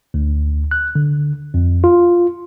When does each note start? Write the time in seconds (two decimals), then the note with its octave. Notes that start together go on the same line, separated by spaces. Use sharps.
0.14 D2
0.71 F#6
0.95 D3
1.54 F2
1.84 F4